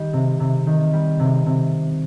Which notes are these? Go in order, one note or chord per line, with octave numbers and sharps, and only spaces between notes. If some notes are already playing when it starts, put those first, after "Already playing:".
Already playing: D#3 G3
C3
C3
D#3
G3
C3
C3